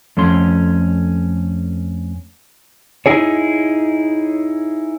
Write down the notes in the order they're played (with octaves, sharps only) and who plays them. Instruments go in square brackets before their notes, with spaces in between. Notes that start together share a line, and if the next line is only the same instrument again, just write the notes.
[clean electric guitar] F2 A3 C#4 C6
[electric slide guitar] D#4 E4 G#4 C#5